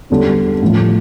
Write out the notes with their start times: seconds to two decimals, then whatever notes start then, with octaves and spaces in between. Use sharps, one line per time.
0.10 E2 D3 G3
0.62 A2 F3